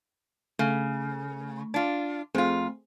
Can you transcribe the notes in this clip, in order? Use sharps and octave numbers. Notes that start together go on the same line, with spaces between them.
C#3 A3
D4 F4
F2 A3 C4 F4 G#4